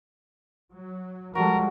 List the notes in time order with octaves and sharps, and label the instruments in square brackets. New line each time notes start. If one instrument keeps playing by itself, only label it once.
[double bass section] F#3
[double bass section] F3 G3 G#3 [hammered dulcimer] F#4 A4 [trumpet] A#4